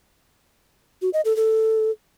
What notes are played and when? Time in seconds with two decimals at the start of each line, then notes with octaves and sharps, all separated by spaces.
1.02 F#4
1.13 D#5
1.25 A4
1.37 A4